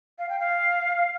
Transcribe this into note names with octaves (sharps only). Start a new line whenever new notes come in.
F5
G5
F5